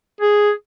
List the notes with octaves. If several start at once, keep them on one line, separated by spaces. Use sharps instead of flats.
G#4